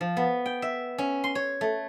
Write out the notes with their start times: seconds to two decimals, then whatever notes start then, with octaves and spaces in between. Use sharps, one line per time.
0.01 F3
0.17 B3
0.46 G5
0.62 E5
0.98 C#4
1.24 C6
1.35 C#5
1.61 A3